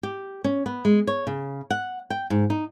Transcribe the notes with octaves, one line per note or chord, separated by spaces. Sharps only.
G4
C#4
B3
G#3
C#5
C#3
F#5
G5
G#2
D#4